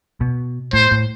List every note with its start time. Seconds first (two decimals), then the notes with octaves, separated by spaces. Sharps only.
0.21 B2
0.73 A2 C5
0.91 A2